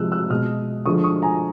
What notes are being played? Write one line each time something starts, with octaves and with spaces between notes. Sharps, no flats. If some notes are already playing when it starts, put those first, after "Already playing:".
Already playing: C3 F3 G#3 E6 F#6
E6 F#6
B2 G#3 D#6 F6
D3 F3 G#3 C#6 D#6
C#6 D#6
G#5 A#5